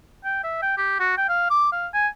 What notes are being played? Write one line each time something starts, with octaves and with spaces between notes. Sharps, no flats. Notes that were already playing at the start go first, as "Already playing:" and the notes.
G5
E5
G5
G4
F#4
G5
F5
D6
F5
G#5